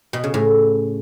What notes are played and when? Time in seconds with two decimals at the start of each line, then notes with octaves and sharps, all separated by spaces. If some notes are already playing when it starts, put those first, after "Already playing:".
0.13 B2
0.24 C#3
0.34 A2